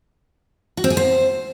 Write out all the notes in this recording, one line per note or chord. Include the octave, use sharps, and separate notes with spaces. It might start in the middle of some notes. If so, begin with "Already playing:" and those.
F#4
C4
G#4
C5